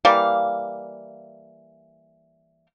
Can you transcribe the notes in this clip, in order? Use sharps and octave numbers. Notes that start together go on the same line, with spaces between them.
E3 G3 A#3 F5